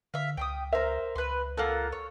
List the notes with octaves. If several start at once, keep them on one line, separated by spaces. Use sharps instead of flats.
D3 E5 F5
C#2 G5 C6 D#6
A#4 C5 E5
C#2 B4 C6
A#3 F4 A4 F#5
C#5